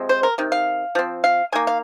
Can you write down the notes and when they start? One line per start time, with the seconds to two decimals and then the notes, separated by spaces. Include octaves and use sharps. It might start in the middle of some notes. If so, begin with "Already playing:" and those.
Already playing: C3 F3 G#3 C4
0.09 C5
0.23 A#4
0.38 C3 D#3
0.52 F5
0.95 F3 C4
1.24 F5
1.52 D#3 A#3 G#5
1.67 F5